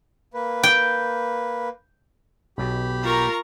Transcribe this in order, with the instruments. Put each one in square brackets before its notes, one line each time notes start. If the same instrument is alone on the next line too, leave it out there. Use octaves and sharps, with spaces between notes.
[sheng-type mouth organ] A#3 B4
[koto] G5
[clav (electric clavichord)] B1 B2 [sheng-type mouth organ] G4 B5
[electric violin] F4 A#4 [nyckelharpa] A#5 C#6